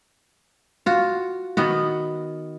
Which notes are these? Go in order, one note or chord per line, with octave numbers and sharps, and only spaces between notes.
F4 F#4
D#3 B3 F#4